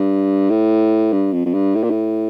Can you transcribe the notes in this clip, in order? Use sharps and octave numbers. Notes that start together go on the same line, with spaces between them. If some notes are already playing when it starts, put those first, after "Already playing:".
Already playing: G2
A2
G2
F2
F2
G2
A2
A#2
A2